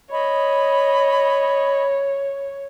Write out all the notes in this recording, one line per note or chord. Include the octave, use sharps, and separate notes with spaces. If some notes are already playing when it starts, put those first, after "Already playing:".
C#5 D#5 B5